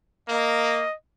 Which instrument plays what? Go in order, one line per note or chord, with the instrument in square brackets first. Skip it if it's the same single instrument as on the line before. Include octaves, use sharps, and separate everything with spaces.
[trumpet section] A#3 [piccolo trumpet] D#5